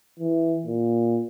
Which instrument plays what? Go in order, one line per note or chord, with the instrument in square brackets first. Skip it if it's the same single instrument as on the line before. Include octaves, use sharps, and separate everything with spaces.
[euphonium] E3
A#2